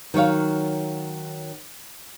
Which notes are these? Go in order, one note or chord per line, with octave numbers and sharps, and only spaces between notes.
D#3 F#3 C#5 F5